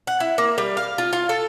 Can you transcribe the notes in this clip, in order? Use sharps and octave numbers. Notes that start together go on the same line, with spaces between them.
F#5
E4
A#3
G3
F5
F4
F4
A4